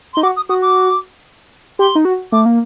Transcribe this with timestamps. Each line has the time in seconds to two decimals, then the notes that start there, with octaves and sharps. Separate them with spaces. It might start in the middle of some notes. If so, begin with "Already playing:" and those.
0.13 D#4 C6
0.22 F#4 D6
0.36 D#6
0.49 F#4 D#6
0.62 D6
1.79 G4 C6
1.95 D#4
2.05 F#4
2.32 A3 D6
2.46 A#3